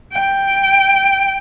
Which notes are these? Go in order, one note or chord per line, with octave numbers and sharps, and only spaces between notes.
G5